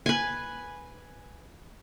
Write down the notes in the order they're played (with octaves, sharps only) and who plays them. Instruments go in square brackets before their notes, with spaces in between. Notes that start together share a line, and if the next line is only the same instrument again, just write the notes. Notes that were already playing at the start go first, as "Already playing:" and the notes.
[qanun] B4 G#5